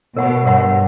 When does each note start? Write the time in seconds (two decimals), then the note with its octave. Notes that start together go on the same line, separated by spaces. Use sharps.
0.16 B2 A#4 C#5 F#5 B5
0.45 G2 A#4 C#5 F#5 B5